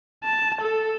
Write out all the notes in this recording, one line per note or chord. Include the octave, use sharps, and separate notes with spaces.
A5
A4